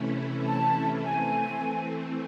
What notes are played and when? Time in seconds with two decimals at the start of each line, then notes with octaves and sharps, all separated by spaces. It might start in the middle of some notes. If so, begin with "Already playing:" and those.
Already playing: C3 E3 A3 C#4 E4
0.47 A5
1.04 E3 A3 C4 G#5